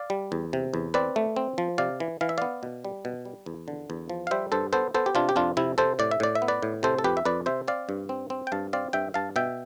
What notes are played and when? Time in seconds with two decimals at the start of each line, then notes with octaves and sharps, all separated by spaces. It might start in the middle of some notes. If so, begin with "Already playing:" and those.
Already playing: D5 F5
0.10 G3
0.32 E2
0.53 C3
0.74 E2
0.94 C4 B4 D5
1.16 A3
1.36 C4
1.58 F3
1.78 C3 D5 F5
2.00 E3
2.21 E3 F5
2.29 E5
2.38 B3 D5 F5
2.63 B2
2.85 G3
3.05 B2
3.25 G3
3.46 E2
3.68 D3
3.90 E2
4.10 F3
4.27 F5
4.31 G3 C5 E5
4.52 G2 A4 C5
4.73 B3 A4 C5
4.94 B3 A4 C5
5.06 G4
5.15 C3 D4 F4
5.29 G4
5.36 F2 D4 F4
5.57 C3 E4
5.78 C3 A4 C5
5.99 A2 D5
6.11 E5
6.20 A2 D5
6.35 E5
6.42 B3
6.48 B4 D5
6.63 A2
6.83 C3 A4 C5
6.98 A4
7.04 F2 G4 B4
7.17 E5
7.25 F2 B4 D5
7.46 C3 C5 E5
7.68 C4 D5 F5
7.89 G2
8.09 C4
8.30 C4
8.47 G5
8.52 G2 F5 A5
8.73 C4 D5 F5
8.93 G2 E5 G5
9.14 G2 F5 A5
9.36 B2 E5 G5